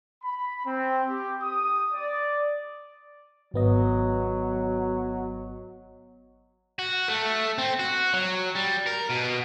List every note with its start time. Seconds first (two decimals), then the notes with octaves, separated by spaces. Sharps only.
0.23 B5
0.65 C4
1.08 G4
1.42 D#6
1.92 D5
3.54 G#1 F#3 B3 D#5
6.79 F#4
7.08 A3
7.58 C4
7.79 F#4
8.14 F#3
8.56 G3
8.87 A#4
9.10 B2